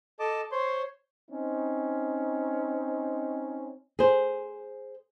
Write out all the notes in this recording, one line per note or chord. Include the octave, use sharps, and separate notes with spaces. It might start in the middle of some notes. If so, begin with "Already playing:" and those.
A4 D#5 A5 D6
C5 C#5 C6
C4 C#4 D#4
G#4 C5